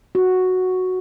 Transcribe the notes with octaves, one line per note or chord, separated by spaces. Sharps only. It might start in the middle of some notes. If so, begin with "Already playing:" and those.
F#4